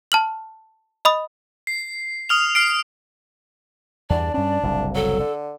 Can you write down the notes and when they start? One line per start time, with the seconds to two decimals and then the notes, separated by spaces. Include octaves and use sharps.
0.12 A5 F6 F#7
1.05 D#5 B5 D#6
1.67 C7
2.29 D#6 F6 F7
2.55 F6 C7 D7
4.10 E2 G2 D4 D5
4.34 G2 C#4 D4
4.63 F#1 C2 A2
4.95 F#3 A4
5.20 D3